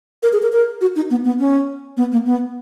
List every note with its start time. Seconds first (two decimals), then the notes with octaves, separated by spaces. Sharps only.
0.23 A#4
0.33 G#4
0.42 A#4
0.52 A#4
0.81 F#4
0.96 D#4
1.10 B3
1.25 B3
1.39 C#4
1.97 B3
2.12 A#3
2.26 B3